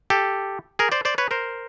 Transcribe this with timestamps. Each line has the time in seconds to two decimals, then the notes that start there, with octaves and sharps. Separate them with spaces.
0.10 G4 A4
0.79 G#4 A#4
0.92 C5 D5
1.05 C5 D5
1.18 B4 C#5
1.31 A#4 C5